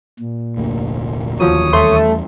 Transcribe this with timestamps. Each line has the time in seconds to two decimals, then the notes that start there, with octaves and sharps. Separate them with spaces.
0.19 A#2
0.57 F1 D2 A#3
1.40 D#2 F3 F#3 C#5 D#6
1.73 E2 G3 A3 C6